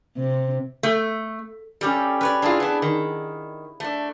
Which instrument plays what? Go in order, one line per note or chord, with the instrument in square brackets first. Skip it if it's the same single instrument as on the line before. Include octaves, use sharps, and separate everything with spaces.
[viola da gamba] C3
[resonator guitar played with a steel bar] A3
[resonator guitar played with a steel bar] G3 [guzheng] C#4 G4 A4
[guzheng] B4 C#5 D5
[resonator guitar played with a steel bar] D4 F4 [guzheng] E4 G#4
[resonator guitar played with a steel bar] B3 D4
D#3
A3 D4